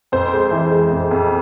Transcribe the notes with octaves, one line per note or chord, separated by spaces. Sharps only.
F2 C5
G#3
E3
G#3
F2
F2